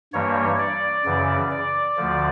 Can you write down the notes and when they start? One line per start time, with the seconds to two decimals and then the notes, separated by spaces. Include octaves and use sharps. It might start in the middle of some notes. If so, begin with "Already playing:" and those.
0.13 G2 E3 G3 A#3 C#5
0.59 D5
1.05 F#2 C#3 E3
1.51 D5
1.97 D2 D3 F3